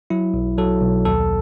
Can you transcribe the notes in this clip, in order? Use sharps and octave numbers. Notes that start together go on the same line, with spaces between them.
F#3 E4
B1
F#3 A4
B1
D#2 A4